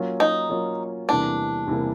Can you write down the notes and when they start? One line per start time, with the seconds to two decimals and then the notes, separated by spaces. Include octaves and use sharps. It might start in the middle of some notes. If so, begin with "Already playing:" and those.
Already playing: F#3 A#3 C#4 F4
0.20 D#4
0.50 F#3 A#3 C#4 F4
1.09 E2 C3 E3 G3 A#3 D4
1.67 E2 C3 E3 G3 A#3